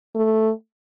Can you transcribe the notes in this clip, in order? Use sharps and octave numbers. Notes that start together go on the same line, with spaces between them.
A3